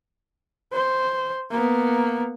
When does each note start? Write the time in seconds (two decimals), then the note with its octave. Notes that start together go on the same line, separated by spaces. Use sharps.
0.73 C5
1.51 A#3 B3